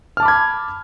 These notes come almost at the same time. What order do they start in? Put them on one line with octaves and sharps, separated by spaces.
F6 A5 D6 B5 G#6